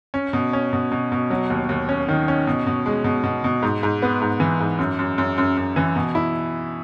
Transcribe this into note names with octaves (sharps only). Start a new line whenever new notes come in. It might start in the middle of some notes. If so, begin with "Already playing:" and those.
C#4
B2
C#4
B2
B2
B2
F#3
D#2
D#2
C#4
D#3
C#4
B2
B2
G#3
B2
B2
B2
G#2
G#2
B3
G#2
E3
G#2
F#2
F#2
F#2
F#2
F#2
E3
B2
E4